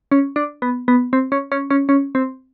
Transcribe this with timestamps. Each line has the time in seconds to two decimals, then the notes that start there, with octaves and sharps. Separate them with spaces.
0.12 C#4
0.36 D4
0.62 B3
0.88 B3
1.13 C4
1.32 C#4
1.52 C#4
1.70 C#4
1.89 C#4
2.15 C4